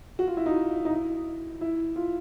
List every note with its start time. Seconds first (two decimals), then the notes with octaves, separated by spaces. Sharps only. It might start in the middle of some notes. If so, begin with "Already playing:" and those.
0.19 F#4
0.27 F4
0.37 E4
0.46 D#4
0.85 D#4
0.90 E4
1.61 E4
1.96 F4